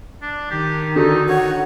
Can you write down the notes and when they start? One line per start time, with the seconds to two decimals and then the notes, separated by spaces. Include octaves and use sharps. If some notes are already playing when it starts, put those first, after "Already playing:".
0.22 D4
0.51 D#3 G4
0.96 D3 D#4 F#4 A4
1.29 C#5 F#5